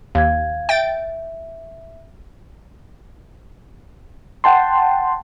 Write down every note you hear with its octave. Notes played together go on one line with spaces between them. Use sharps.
D#2 F5 G#6
E5 G5 A6 D7
F#5 G5 A5 C6